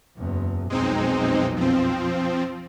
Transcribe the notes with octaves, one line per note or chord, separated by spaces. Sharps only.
F#1 E2
B1 F2 G#3 C4 D#4
F3 C4